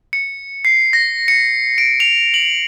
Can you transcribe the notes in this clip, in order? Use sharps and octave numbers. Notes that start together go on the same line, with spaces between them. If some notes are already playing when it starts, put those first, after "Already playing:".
C#7
C7
A#6
C#7
D7
F7
F#7